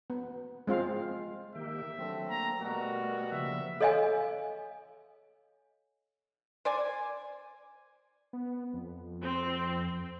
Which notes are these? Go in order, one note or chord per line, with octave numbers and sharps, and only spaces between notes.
B3
G#3 C4 F4 F5
D#3 A#3 G4 E5
D3 F#3 A3 C4
A#3 A#5
B2 G3 A3 B3 F#4 A#4
C#3 F3 A#3 E5
A4 C#5 D#5 F5 G#5
C5 D5 G#5
B3
F2
C4